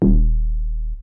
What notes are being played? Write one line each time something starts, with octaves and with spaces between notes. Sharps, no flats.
D#1